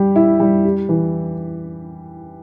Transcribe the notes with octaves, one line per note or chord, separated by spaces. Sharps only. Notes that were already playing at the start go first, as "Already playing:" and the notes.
Already playing: G3 G4
E4
G3
G4
E3